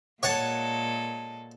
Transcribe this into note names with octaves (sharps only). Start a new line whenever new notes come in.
A#2 G#3 A4 C#5 F#5 A5